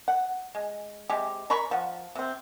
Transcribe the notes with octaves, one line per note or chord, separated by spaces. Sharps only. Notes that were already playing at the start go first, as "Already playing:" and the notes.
F#5
G#3
C3 G#3 G4
A#4 A#5 B5 C#6
F3 F#5
C3 C4